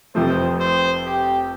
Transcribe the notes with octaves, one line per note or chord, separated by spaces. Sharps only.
F1 F2 C3 F3 A3 C5
C5
G4